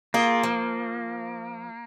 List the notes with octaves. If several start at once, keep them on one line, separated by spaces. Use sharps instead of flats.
A#3 F4 G#4
F3